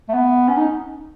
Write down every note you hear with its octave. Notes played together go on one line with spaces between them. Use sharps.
A3
B3
C#4
D#4